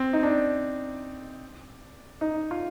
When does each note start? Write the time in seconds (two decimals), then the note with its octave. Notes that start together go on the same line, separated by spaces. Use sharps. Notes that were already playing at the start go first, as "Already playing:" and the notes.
Already playing: C4
0.13 D#4
0.23 D4
2.21 D#4
2.51 F4